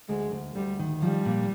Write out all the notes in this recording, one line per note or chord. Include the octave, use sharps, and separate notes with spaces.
D2 G#3
D2
D2 G3
D#3
F3 G3
A#2